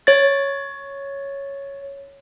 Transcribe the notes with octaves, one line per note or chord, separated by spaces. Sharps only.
C#5 A6